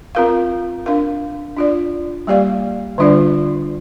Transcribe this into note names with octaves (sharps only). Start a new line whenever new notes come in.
C4 F4 A#4 F5
D4 A#4 F5
D4 F4 D5
G3 A#3 G4 D5 F5
D3 G3 D4 F4 D5